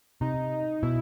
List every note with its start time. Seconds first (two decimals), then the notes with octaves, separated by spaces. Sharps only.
0.21 C3 D#4
0.83 B2 E4